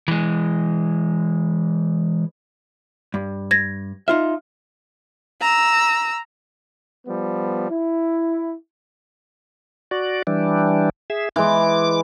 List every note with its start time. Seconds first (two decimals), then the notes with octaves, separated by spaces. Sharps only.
0.08 E3 G#3
3.14 G2
3.51 G#6 A#6
4.08 D#4 F4 E5 F6
5.41 A#5 E6
7.06 F3 G3 B3
7.69 E4
9.91 F#4 D5
10.27 E3 G3 D4
11.10 G#4 E5
11.36 E3 G#3 D6